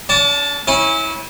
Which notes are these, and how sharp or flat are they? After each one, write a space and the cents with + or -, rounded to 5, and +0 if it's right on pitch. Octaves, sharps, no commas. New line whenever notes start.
D4 -45 A5 +0
C#4 -20 E4 -30